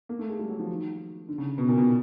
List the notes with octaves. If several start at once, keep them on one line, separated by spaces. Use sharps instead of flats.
A#3
A3
G#3
G3
F#3
F3
D#3
D3
C#3
B2
A#2
B2